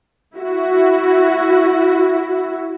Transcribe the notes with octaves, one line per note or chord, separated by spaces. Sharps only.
E4 F#4